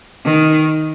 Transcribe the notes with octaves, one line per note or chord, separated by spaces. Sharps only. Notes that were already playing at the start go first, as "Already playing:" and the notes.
D#3